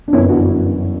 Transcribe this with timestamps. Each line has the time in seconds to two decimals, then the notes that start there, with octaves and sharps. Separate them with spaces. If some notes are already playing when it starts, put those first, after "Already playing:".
0.08 D4
0.13 G1 F#2 E3 C#4 E4
0.29 D4 F#4